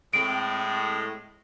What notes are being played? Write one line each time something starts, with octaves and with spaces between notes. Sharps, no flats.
A2 G#3 C4 D7